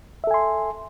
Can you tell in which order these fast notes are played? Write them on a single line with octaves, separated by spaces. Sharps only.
E5 A4 G#5 C6